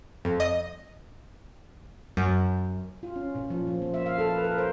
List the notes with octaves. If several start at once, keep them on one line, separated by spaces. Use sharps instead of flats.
F2
D#5
F#2
F4
C#4
A#2
F3
F3
A#3
E5
F5
A4
B4
A#4
C5